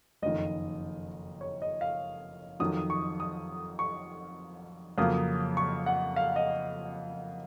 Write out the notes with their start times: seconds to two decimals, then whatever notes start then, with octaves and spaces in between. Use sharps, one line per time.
0.22 F#1 F2 D#3 D#5
1.41 C#5
1.62 D#5
1.81 F5
2.60 F2 D#3 F#3 D#6
2.90 C#6
3.20 D#6
3.79 C#6
4.98 F2 C#3 F#3 A#3 D#6
5.57 C#6
5.86 F#5
6.16 F5
6.36 D#5